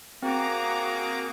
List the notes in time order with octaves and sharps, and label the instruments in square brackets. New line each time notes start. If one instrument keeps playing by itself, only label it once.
[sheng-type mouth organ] A#3 [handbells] C4 [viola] F#4 [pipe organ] G#4 A#5 D6